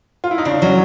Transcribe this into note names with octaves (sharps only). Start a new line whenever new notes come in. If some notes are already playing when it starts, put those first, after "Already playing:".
F4
E4
D#4
C#3 D4
F#3 C#4